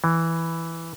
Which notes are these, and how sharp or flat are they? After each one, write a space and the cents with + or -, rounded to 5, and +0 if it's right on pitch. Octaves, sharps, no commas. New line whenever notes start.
E3 +0